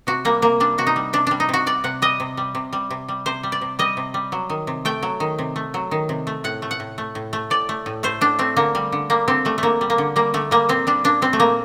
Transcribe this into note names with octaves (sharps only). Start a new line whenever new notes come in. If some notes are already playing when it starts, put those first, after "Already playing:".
C3 F#4
G3 A#3
C3 A#3
G3 D4
C3 F#4
D#4
G3
C3 D4
G3 D4
D#4
C3 F#4
G3 D5
C3 F#5
G3 D#5
C3
G3
C3
G3
C3
G3
C3 C5
G3
D5
C3
G3 D#5
C3
G3
F#3
D#3
C3
A3 G5
F#3
D#3
C3
A3
F#3
D#3
C3
A3
A2 F#5
A3
F#5
A2
A3
A2
A3
A2 D5
A3
A2
A3 C5
A2 D4
A3 C4
D3 A#3
G3
D3
G3 A#3
D3 C4
G3 A3
D3 A3 A#3
G3
A#3
D3
G3 A#3
D3 A3
G3 A#3
A#2 C4
G3 D4
A#2 D4
G3 C4
A3
A#2 A#3